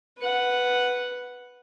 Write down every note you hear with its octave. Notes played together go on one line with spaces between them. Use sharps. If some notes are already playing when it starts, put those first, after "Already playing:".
B4 F#5